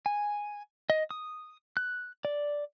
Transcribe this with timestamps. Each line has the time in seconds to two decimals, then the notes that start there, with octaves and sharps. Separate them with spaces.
0.06 G#5
0.90 D#5
1.11 D#6
1.77 F#6
2.25 D5